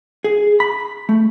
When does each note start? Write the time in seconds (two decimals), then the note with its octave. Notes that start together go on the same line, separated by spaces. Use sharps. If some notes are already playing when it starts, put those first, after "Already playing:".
0.24 G#4
0.60 B5
1.09 A3